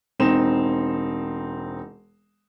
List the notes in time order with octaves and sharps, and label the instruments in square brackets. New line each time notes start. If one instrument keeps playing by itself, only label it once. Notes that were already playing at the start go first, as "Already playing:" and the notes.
[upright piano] E1 C4 D#4 C6 E7